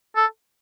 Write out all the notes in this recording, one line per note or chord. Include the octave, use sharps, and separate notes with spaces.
A4